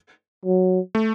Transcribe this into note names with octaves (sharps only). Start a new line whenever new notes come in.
F#3
A3